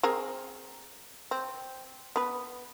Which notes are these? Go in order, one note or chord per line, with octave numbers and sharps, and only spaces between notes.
C4 G#4 A#4
C4
B3 B4